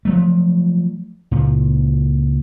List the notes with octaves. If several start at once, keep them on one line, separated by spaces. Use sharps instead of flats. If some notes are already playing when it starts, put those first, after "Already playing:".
F3 F#3 A3
C#2 A#2